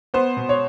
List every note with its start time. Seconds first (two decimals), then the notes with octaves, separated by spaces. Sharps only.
0.14 B3 C5
0.37 B2
0.49 C#5